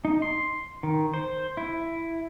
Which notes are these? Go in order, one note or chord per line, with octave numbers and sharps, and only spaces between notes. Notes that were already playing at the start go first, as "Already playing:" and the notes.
D#4
C6
D#3
C5
E4